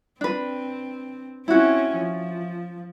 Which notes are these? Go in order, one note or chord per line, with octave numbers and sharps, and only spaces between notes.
C4 D4 B4
C4 C#4 E4 F#4
F3